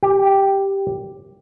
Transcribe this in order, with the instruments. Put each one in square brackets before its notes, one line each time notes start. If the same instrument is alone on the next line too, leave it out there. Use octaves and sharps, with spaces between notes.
[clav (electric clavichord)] G4